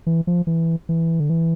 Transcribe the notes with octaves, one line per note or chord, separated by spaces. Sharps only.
E3
F3
E3
E3
D3
E3